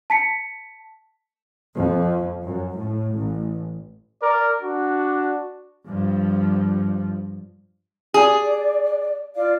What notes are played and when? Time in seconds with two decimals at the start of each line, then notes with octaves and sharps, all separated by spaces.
0.10 A5 B6 C#7
1.78 F2
2.45 F#2
2.75 A2
3.17 A1
4.22 A#4 D5
4.61 D4 F#4
5.87 G2 F3
8.14 G#4 D5
9.35 F4 D5 F5